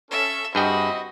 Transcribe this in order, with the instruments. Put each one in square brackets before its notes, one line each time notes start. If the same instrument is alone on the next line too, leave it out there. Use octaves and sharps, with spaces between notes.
[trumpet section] C#4 A4 [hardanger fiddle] E5
[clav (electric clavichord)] G2 G#4 G5 [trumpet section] C4 E4 D#5 [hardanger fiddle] F#4 [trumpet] B5